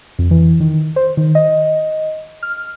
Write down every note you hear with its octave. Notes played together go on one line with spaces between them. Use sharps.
F2
E3
D#3
C5
D#3
D#5
F6